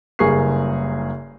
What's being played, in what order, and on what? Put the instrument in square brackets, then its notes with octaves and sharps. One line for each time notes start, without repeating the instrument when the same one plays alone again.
[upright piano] F#1 G2 G#4 A#4 C#6 C7